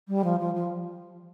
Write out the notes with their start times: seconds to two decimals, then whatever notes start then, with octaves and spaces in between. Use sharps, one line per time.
0.08 G3
0.24 F3
0.40 F3
0.55 F3